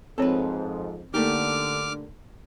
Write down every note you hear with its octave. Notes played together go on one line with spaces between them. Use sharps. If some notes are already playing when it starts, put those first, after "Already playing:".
F2 G#2 F3 C4 A4 B4 C#5
D3 A3 A#3 D#4 G4 A4 D6 F6